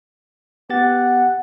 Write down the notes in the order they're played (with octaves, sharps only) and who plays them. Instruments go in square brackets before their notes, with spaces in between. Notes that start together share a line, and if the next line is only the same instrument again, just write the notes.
[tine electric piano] B3 G4 A6 [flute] F#5